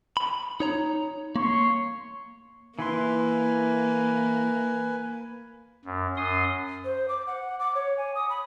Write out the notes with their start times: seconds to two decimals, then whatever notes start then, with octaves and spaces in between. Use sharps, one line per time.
0.17 B5
0.60 D#4 C#5 A#5
1.36 A#3 C#5 C6 C#6
2.79 E3 A#3 E4 B4 G#5 C6
5.85 F#2
6.17 F#2 C6 D#6
6.85 C5
7.09 D6
7.27 F#5
7.59 D6
7.75 C#5
7.97 G#5
8.15 D#6
8.30 B5